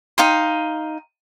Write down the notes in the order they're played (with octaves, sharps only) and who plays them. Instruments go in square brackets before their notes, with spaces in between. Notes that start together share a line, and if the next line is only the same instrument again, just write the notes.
[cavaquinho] D#4 F5 G5 C6